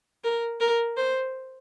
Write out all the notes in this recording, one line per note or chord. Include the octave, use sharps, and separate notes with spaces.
A#4
A#4
C5